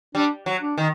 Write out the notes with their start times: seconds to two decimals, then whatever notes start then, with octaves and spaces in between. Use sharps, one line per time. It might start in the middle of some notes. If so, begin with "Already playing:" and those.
0.15 G3 D4
0.46 F#3
0.61 D4
0.78 D#3